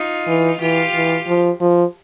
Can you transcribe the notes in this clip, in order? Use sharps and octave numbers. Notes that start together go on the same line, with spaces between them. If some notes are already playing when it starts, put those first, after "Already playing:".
Already playing: D#4 F4
E3
E3 F4 G4
E3
F3
F3